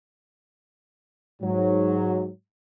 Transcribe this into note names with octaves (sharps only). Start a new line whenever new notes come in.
G#2 F#3